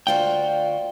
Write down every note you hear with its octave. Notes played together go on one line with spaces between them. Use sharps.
D2 F4 F#4 D5 F5 G5